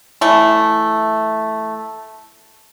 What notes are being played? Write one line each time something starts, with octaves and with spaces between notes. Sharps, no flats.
E3 A3